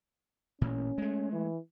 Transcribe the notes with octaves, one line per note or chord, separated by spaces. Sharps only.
A1 A#2 C#4
G#3 A3
E3